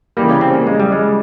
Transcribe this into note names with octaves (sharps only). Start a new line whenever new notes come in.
C#3 E3 G3 A#3
C#4
C4
A#3
G#3
G3
G#3